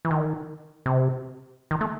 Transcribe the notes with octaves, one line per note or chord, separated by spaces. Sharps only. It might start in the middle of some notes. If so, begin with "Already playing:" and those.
E3
D#3
C3
D#3
A3